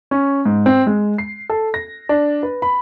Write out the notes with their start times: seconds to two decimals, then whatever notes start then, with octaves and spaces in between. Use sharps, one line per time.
0.11 C#4
0.45 G#2
0.66 C4
0.87 G#3
1.18 C7
1.49 A4
1.74 A#6
2.09 D4
2.43 B4
2.62 B5